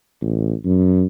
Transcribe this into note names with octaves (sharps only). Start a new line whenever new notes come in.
A1
F#2